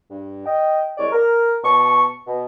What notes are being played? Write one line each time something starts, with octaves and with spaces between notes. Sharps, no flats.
G2
D#5 G5
C2 G#3 C#5 D5
A#4
B2 A5 C#6
B2